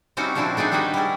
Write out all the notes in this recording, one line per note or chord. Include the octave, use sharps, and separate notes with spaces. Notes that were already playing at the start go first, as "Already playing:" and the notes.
G3 C4 C#4 D#4 E4 F#4
A#2 F3 C4 D4 E4 F#4
A3 D4 D#4 G#4
G3 D#4 F#4 G#4 B4 D#5
G3 C#4 E4 G#4